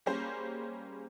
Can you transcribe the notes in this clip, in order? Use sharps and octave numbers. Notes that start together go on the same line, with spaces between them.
G3 A#3 C#4 G#4 C5